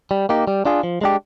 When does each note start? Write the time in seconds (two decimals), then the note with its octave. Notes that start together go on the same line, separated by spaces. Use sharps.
0.11 G3
0.29 A#3 D#4 G4
0.47 G3
0.65 D4 F4 G#4
0.83 F3
1.01 G#3 D4 G4